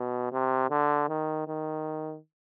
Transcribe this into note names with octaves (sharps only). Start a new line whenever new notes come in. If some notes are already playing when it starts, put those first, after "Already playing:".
Already playing: B2
C3
D3
D#3
D#3